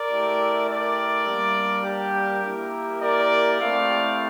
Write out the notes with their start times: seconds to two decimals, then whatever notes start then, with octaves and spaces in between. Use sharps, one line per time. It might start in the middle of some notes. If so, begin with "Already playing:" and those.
Already playing: A#4 D5
0.09 A3 E4 G4
0.67 A#4 D5
1.26 G3 A#3 D4
1.84 G4 A#4
2.42 A#3 E4 G4
3.01 A#4 D5
3.59 A3 C4 E4 G4 D5 F5